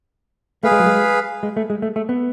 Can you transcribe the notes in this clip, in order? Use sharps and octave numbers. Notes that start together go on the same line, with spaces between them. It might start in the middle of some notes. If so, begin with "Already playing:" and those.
A3 G#4 B4 F5
G#3
F#3
G#3
G#3
A3
G#3
A3
A3
B3